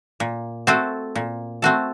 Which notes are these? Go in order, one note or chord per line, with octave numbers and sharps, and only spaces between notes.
A#2
A3 C4 F#4 A4
A#2
A3 C4 F#4 A4